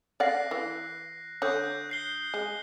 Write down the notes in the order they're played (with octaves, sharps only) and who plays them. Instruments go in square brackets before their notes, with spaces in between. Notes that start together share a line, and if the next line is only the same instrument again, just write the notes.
[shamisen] D5 F5 F#5 [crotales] F#6 A#6 C7
[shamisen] E3
[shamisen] D3 C#5 [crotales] D#6 F#6 G6
[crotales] F#6 C7 G7
[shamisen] G#3